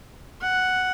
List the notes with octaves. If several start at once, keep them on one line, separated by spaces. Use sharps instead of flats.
F#5